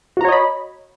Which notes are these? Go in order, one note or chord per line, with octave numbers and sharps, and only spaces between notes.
F#4 C#5 D#5 A#5 B5